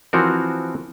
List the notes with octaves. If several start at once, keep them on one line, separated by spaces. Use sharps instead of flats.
E3 F3 C4 F#4 A#4